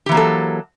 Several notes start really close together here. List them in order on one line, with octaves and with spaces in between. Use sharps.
G4 E3 A#3 F#3 A4